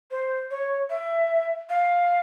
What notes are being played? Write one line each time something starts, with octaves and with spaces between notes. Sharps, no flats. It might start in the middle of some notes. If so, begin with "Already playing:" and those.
C5
C#5
E5
F5